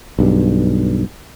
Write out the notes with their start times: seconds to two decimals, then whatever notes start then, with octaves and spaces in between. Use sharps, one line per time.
0.19 B1 G2